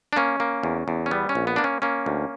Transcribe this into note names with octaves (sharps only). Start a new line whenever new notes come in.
D4
A#3 C#4
A#3
E2
E2
C#4
G3 B3
C#4
A#1
B3
A#3 D4
C#4
A#3 C#4
D2